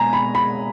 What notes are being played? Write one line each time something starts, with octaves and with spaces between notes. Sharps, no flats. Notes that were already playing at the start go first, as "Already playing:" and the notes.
Already playing: B2 G#3 G#5 A#5
B5
B5